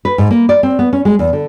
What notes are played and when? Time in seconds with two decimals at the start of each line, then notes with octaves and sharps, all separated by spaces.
0.05 B4
0.18 G#2
0.31 A#3
0.49 D5
0.63 C4
0.79 B3
0.93 C#4
1.05 G#3
1.19 E2
1.33 D3